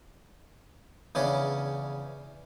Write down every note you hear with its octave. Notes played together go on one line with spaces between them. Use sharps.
E2 C#3 C#4 D4